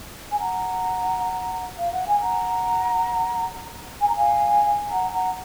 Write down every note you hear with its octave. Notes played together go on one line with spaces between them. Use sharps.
G#5
F#5 A#5
F5
F#5
G#5
F#5 A#5
G#5
A#5
F5 G#5
F#5 A#5
F#5 A#5